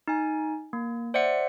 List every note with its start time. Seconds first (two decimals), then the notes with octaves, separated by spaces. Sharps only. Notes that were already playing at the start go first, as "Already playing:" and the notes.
0.08 D#4 G#5
0.73 A#3
1.14 C5 D5 E5 F#5 C#7